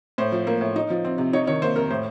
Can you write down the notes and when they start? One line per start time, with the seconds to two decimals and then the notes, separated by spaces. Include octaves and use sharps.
0.18 A2 C5
0.32 F3
0.47 A#3
0.61 A2
0.76 D#4
0.90 F3
1.04 C4
1.18 C3
1.33 D#4 C#5
1.47 D#3 C#5
1.62 A#3 C5
1.76 F2 A#4
1.90 A2 C5